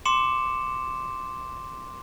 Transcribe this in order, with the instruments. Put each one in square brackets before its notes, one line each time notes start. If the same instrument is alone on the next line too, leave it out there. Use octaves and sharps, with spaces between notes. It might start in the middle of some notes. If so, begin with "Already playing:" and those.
[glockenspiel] C6 D6 C#7 E7